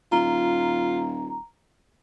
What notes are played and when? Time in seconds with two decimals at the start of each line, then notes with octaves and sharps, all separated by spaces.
0.12 D#1 F4 A#5